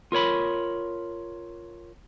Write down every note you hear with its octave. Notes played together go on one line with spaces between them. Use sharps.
F4 A#4 C#5 B5